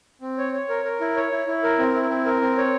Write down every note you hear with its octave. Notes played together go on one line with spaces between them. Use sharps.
C4
C#5
C#5
A#4
A#4
E4
C#5
E4
E4
A#4
C4
E4
C4
A#4
C4
C#5